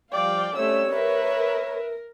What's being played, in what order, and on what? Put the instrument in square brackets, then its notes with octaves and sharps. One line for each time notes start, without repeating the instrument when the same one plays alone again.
[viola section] F3 G3 F5 [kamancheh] D5 G5
[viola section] G3 C4 C#4 [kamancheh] A3 E6 [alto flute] C#5
[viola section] A#4 [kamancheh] B4 E5